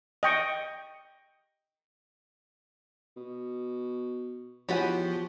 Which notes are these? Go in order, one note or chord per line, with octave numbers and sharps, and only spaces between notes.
D#5 G5 C#6
B2
E2 F3 F#4 G4 C#5 F#5 G#5 B5